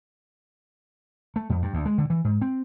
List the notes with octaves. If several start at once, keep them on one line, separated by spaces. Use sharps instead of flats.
A3
F2
G2
D2
G#3
D3
E3
G#2
C4